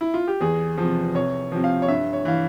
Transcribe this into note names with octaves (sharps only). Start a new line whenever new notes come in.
E4
F4
G4
E2 G#4
C3 F3
C2 C#5
C3 F3
F5
C#5
G2 E5
C#5
E3 F5